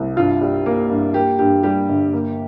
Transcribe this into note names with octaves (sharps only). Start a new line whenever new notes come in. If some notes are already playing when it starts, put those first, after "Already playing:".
Already playing: C2
G2 F4
G3
A#3
G2
A#3 G4
G2 G4
G3 G4
G1
A#3